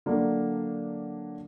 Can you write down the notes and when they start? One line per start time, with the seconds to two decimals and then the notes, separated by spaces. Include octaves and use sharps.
0.06 D3 F#3 A#3 D4 F#4